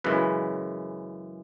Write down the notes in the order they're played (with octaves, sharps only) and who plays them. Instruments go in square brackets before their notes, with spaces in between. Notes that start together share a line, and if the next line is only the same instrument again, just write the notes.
[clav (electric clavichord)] F#2 C#3 E3 G#3 B4